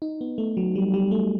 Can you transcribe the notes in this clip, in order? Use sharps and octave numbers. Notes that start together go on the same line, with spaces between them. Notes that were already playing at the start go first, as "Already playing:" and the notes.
D#4
B3
A3
F#3
G3
G3
A3